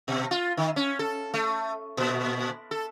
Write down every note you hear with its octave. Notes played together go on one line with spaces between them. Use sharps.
B2
F4
D#3
C#4
A4
A3
A#2
A4